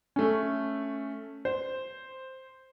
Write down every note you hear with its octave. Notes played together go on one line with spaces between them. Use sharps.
A3 C#4
C5